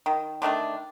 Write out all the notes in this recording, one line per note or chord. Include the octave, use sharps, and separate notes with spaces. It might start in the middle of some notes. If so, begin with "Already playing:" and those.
D#3
D3 D#3 A3 D4